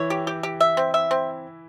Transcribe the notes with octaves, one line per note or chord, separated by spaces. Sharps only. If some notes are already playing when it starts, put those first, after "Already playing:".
Already playing: E3 E4 C#5
G4
G4
G4
E5
C4
E5
C4